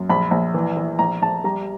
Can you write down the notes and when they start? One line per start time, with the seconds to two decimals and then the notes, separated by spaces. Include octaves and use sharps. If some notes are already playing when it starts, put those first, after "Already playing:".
Already playing: F#2
0.10 A#1 B5
0.31 A#1
0.54 E3
0.77 E3
0.99 A#1 A#5
1.22 A#1 A5
1.44 G3 A#5